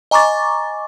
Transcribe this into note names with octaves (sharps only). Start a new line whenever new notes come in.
D#5 G#5 A#5 C#6 D6 A6